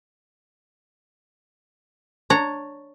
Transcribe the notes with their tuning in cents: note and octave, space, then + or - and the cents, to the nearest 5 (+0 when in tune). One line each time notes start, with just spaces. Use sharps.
D4 +0 C#5 +0 A#5 -15